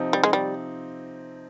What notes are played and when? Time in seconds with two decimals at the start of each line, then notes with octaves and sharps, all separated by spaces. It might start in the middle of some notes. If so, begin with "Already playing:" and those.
Already playing: C3 F3 C4 D#4
0.13 G3
0.24 G#3
0.33 G3